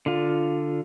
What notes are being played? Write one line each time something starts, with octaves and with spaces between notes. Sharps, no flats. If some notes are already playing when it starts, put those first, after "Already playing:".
D3 F4